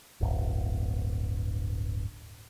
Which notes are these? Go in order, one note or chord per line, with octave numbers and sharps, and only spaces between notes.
D1 G1